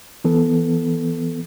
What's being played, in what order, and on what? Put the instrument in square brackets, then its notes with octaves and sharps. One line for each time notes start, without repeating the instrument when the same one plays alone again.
[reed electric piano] E3 B3 A4